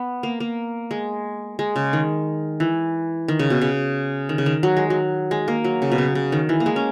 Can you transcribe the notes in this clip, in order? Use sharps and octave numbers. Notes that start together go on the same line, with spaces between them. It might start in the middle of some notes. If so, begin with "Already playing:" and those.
Already playing: B3
A#3
A#3
G#3
G#3
C#3
D#3
E3
D#3
C#3
B2
C#3
D#3
C#3
D#3
F#3
G#3
F#3
G#3
A#3
F#3
C#3
B2
C#3
C#3
D#3
E3
A#3
G#3
C#4